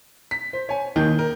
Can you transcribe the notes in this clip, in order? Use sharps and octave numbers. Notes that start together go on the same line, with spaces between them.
B6
C5
C#5 G#5
D#2 D#3 G6
A#4